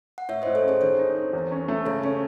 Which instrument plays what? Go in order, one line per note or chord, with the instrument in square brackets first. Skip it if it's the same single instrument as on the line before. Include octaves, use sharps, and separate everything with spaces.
[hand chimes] F#5
[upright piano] A2 [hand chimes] C#5 E5
[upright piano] A2 [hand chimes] C5 D#5
[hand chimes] A4 C#5
[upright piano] C#4 [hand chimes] G#4 C5
[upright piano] D#3 [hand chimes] A4 C#5
[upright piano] D#4
C4
E2
C#4
A3
[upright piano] C#3 [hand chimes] A4 C#5
[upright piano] C#4 [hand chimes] A4